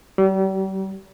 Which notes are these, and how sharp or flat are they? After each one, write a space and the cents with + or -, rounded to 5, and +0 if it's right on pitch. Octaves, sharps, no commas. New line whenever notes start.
G3 -40